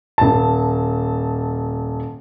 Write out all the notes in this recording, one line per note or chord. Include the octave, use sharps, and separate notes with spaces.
D#1 A5